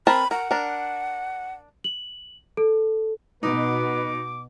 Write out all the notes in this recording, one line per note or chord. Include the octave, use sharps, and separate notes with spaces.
C4 A#4 A5 B5
A#4 F#5
D4 A#4
F#7
A4
B2 D#4 B4 D6